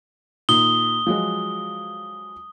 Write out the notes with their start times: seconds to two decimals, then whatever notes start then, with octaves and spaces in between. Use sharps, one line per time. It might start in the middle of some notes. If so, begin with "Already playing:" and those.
0.49 A#2 D#3 D#6 G7
1.07 F3 F#3 G#3